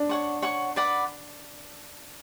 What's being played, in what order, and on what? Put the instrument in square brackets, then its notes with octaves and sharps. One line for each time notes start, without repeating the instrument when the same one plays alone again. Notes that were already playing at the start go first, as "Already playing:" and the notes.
Already playing: [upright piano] D4
[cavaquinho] C#5 F#5 C#6
C#5 F#5 C#6
B4 D5 F#5